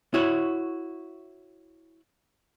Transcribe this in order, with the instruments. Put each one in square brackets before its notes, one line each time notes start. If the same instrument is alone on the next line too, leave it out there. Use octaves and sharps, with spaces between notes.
[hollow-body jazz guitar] E4 F#4 C#5